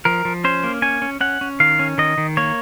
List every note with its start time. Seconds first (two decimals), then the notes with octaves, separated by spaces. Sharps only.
0.05 F3 A#4
0.25 F3
0.44 C#4 C5
0.64 A#3
0.82 C#4 G#5
1.02 C#4
1.21 C#4 F#5
1.41 C#4
1.60 D#3 F5
1.79 C#4
1.98 D#3 D#5
2.18 D#3
2.37 A#3 C#5